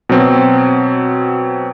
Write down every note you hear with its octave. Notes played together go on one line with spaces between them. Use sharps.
B2 F#3 C4